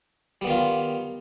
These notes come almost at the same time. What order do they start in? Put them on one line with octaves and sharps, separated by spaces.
G3 B3 D#3 F4